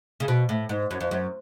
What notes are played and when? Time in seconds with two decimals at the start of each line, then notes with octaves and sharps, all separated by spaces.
0.20 C#3
0.28 B2
0.49 A2
0.69 G#2
0.91 F#2
1.01 F2
1.11 F#2